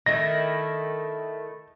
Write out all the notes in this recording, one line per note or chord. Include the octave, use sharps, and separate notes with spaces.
D#3 A3 E4 A#6